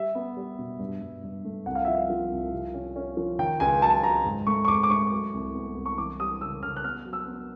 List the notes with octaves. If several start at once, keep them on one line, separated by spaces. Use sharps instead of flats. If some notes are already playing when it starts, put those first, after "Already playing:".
Already playing: G3 E5
B3
G3
B2
G2
G2
G2
A3
C2 F#5
F5
F3 E5
F5
F3
C2
C3
C#4
C#4
F3
D#3 G5
C#2 G#5
F#3 A5
F#3 A#5
G#2
A3 C#6
C#6
G#2 D6
D6
A3 C#6
F#3
C2
B3
C2
C#6
E3 D6
G3 D#6
C#3 E6
C#3 F6
F#6
B3 F6
F#3
E6
B3